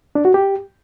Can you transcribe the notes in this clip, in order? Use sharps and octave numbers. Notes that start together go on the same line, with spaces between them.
D4
F#4
G4